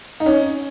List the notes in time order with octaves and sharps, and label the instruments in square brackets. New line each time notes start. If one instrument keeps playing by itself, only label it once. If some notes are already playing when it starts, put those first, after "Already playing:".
[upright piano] D#4
C#4